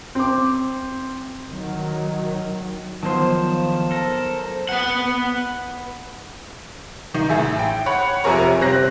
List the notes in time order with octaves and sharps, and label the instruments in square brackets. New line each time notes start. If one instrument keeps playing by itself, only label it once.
[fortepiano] C4 D6
[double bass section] D#3 F#3
[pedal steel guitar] D#3 F3 [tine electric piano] F#3 B3 C6 [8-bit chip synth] C5 A5
[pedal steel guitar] A4 A#4
[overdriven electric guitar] B4 F#5
[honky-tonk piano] D#3 D#4
A1 G#4 E5
G5
C#5 F#5 B5
F2 C3 G#4 A#4 C#5
G1 C4 F#6 A#6